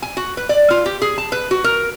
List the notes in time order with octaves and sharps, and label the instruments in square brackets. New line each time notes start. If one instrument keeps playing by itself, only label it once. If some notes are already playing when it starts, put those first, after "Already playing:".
[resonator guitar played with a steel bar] G#5
F#4
B4
D5
F4
G4
G#4
A5
B4
F#4
A#4